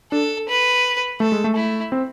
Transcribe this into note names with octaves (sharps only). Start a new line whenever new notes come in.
D4 A4
B4
A3 A4
G#3
A3
E4
C4